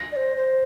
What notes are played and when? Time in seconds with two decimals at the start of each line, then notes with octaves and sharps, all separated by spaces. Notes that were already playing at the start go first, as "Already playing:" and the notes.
Already playing: A#6
0.12 D5
0.16 C5
0.37 C5